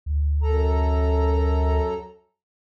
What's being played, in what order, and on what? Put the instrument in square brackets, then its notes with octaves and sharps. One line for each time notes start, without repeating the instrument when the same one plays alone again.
[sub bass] D2
[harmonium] F#2 A4 A#5